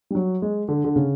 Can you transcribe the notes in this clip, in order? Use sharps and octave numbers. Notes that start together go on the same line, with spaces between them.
G3
F#3
G#3
D3
D3
C#3